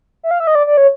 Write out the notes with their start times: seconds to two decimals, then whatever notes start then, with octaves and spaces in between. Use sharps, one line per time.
0.23 E5
0.31 F5
0.40 E5
0.47 D#5
0.55 D5
0.67 D5
0.77 C#5